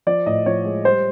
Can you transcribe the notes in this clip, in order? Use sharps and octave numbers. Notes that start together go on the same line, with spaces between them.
F3 D5
A2 D#5
F3 C#5
G#3
G3 C5